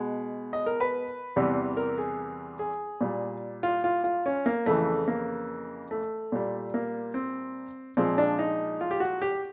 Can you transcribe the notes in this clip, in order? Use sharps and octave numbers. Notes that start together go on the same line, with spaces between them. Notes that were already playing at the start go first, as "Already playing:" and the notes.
Already playing: B2 G#3
D#5
A#4
B4
E2 C3 E3 G3
A#4
G#4
G#4
A#2 G3
F4
F4
F4
C#4
A#3
F2 C#3 E3 A3
A#3
A3
A#2 G3
A#3
C4
A#2 F3 G#3 C4
D4
D#4
F4
G4
F#4
G4